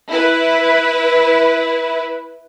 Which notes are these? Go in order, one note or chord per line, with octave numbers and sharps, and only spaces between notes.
E4 B4